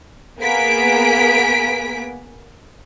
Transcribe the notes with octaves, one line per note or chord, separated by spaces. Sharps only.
A#3 B3 G#4 B6 D7